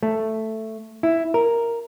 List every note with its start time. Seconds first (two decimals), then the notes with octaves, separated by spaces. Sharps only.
0.03 A3
1.03 E4
1.34 A#4